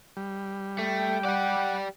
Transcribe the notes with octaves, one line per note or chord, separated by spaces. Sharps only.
G3
A3 G5
G4 D5 F#5